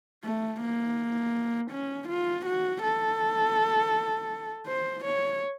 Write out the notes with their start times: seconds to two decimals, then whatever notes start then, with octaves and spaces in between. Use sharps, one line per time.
0.24 A3
0.61 A#3
1.71 C#4
2.09 F4
2.46 F#4
2.82 A4
4.67 C5
5.05 C#5